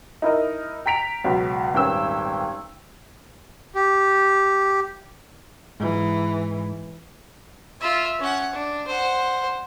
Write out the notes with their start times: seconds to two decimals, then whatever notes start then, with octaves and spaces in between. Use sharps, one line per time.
0.22 D#4 E4 A#4 D#5
0.86 G5 A#5 B6 D7 F7
1.24 C#2 B2 F#3
1.73 D#1 G#1 C#4 B4 G5 E6
3.75 G4
5.80 G#2 E3
7.81 F4 E5
8.19 C#4 F#5
8.53 D4
8.87 C5 F#5